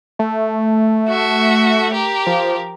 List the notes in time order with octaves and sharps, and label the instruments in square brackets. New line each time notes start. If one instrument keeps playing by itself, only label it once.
[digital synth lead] A3
[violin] F#4 E5
G4 A#4
[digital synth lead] F3